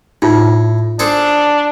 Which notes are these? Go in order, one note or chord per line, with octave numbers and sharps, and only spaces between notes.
A2 D#4 F4
D4 G#4 A4 C5